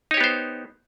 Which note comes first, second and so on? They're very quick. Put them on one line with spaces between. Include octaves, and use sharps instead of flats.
D#4 C#5 G4 B3 C5